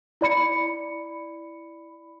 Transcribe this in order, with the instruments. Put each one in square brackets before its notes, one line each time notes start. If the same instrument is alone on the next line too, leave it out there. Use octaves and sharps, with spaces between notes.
[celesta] E4 D5 B5 C#7